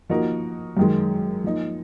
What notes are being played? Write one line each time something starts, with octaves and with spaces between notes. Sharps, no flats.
F3 A#3 D#4 F#4 A#4
F#2 D#3 G#3
F3 A#3 D#4